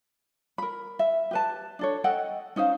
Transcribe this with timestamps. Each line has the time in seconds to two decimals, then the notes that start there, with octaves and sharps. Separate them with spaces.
0.58 A#4 B5
0.99 E5
1.31 G4 B4 A5
1.79 D4 A4 C#5
2.04 A4 D#5 F#5 G5
2.56 C#4 D#4 C5 F5